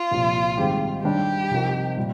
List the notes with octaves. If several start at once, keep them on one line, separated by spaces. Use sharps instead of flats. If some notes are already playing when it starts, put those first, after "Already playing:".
Already playing: F4
C2 A#2 F3
G#2 D#3 G3 C4 G4
D#3 G3 D4 G4
C3 F3 C4 D#4 A#4
A#2 G3